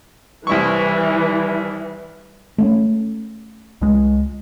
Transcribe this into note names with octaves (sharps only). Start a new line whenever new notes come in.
C2 E3 G3 E4 C#6
A3 A#3 C#4
C#2 G#3